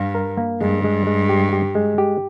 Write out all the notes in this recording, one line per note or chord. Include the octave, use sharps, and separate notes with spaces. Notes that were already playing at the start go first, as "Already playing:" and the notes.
Already playing: G2 F5
A#4
A#3
G2 G#3
G#3
G#3
G4
G4
G#3
G4